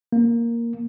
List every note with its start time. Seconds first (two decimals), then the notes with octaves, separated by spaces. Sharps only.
0.12 A#3